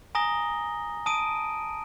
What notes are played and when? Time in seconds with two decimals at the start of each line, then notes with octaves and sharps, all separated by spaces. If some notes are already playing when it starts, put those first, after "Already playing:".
0.15 G#5 A#5 D#6 A#6 G7
1.06 A5 D#6 D7 D#7